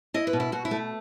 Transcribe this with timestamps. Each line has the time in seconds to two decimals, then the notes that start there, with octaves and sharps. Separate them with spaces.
0.14 E4 D#5
0.27 B4
0.33 B2
0.40 E4
0.52 B2 F#4
0.65 E4
0.71 A3